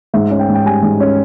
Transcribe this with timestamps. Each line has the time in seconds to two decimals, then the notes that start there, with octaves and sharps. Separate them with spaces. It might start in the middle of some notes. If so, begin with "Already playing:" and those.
0.14 G#2 E5
0.31 C#4
0.40 G5
0.49 G#2
0.54 G5
0.65 G3 G#5
0.83 G#2
1.00 C#4